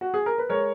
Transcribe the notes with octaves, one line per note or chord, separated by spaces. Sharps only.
F#4
G#4
A#4
B4
G#3 A#4 C#5